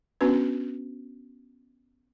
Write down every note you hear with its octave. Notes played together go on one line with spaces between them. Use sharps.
B3 C#4 D4 F#4 B4